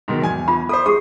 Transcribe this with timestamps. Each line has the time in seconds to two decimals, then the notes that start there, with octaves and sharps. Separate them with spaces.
0.08 G#2 B2 D#3
0.22 E2 G#5 G#6
0.48 F4 B5
0.69 A4 C5 B5 D#6
0.86 G4 G#4 D#6